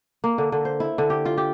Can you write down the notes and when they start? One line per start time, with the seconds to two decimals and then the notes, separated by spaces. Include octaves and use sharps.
0.24 A#3
0.38 D3
0.52 D3
0.65 C5
0.80 E4
0.98 D3
1.10 G4
1.25 F4
1.37 G4